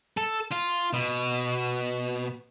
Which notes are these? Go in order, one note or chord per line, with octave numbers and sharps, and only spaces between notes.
A4
F4
B2